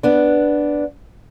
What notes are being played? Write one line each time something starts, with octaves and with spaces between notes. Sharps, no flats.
B3 D4